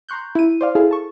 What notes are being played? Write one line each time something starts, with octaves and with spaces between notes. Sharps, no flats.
A#5 C6 C#6 F#6 G6
E4 D#7
C5 D5 F5
E4 G#4 A4 F5
A5 C#6